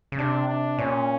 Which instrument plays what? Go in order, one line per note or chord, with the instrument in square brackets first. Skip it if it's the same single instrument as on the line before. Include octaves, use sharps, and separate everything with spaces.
[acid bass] C#3
[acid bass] C3 [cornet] D4
[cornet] D4
[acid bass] A#2 [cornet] C#4